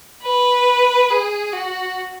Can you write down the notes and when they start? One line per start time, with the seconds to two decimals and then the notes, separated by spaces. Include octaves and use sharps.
0.22 B4
1.10 G#4
1.53 F#4